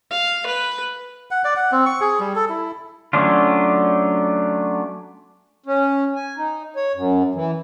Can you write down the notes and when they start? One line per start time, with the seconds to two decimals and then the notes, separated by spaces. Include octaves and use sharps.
0.11 F5
0.46 B4
1.31 F#5
1.45 D5
1.56 F#5
1.72 C4
1.86 C#6
2.01 G#4
2.20 G3
2.35 A4
2.49 E4
3.13 F#3 A3 C#4 D4 F4
5.66 C#4
6.15 G#5
6.37 D#4
6.76 C#5
6.95 F#2
7.35 E3